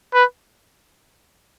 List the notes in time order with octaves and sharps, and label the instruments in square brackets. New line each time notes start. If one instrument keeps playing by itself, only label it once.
[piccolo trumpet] B4